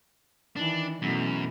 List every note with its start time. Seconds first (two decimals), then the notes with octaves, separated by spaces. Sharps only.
0.56 D#3 E3 D4
1.02 F#2 B2 E3 A3